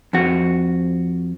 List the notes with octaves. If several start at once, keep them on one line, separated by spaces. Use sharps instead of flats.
F2 F#4